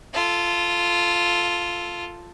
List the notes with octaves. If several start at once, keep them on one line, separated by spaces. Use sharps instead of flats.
F4 A4